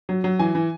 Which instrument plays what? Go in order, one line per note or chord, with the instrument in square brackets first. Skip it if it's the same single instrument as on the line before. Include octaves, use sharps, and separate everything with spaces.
[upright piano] F#3
F#3
E3 G#5
E3